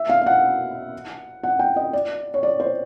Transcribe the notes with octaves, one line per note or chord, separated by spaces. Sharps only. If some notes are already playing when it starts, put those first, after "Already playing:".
Already playing: E5
F5
F5
F#5
F#5
G5
D#5
D5
C#5
D5
C5